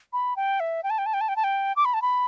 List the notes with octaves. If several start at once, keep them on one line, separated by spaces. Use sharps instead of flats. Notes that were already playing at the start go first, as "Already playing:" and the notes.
B5
G5
E5
G5
A5
G5
A5
G5
A5
G5
A5
G5
D6
B5
A5
B5